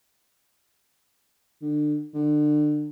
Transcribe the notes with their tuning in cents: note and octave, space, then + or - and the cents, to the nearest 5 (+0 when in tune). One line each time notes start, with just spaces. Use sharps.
D3 +25
D3 +30